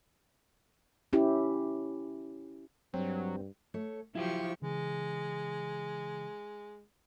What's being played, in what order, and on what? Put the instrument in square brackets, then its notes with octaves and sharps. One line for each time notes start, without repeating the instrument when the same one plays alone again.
[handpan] C#4 E4 G4
[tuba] G2 [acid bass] F#3 [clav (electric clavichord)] C4
[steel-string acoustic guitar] A3 C#5
[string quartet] F3 G4 C#6 [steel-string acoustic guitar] F#3 [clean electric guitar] E4 F4 C5
[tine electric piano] C#3 E3 [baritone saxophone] G#3